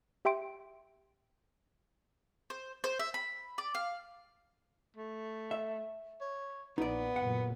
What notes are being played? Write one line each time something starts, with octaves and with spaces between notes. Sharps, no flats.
G4 E5 G5 C6 D7
C5
C5
E5
B5
D5
F5
A3
E5
C#5
A#1 B3 D#4 D5
F#1 A#2 F#3 F#5